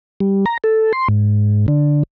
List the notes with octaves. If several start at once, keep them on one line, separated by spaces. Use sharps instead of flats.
G3
A#5
A4
C6
G#2
D3